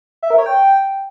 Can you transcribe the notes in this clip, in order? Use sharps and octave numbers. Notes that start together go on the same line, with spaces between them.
E5
A#4
C#5
G5